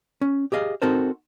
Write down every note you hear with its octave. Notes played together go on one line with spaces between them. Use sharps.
C#4
G4 G#4 D#5 F5
C4 D#4 F#4 A4 A#4 C5